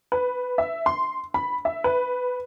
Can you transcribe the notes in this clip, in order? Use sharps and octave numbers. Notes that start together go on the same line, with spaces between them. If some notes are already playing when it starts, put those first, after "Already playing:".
B4
E5
C6
B5
E5
B4